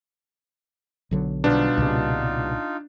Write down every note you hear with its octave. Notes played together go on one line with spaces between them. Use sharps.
B1 D3 F#3
B2 G3 B3 D4 D#4 F4
C2 A#2 C#3